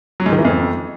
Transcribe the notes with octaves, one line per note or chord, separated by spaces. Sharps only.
F#3
G#2
D#3
E3
F2